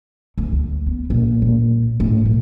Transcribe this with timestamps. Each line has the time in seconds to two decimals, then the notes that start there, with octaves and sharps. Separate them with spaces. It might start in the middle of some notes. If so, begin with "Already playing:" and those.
0.38 D2
0.52 D2
0.86 B3
1.10 A#1
1.42 A#2
2.00 A2
2.25 B1